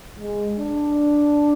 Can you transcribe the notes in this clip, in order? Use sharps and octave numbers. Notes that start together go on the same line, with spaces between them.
G#3
D4